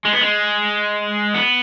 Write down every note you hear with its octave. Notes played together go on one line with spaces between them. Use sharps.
G#3
B3
G#3
B3